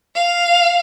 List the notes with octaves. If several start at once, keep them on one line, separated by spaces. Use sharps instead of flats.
F5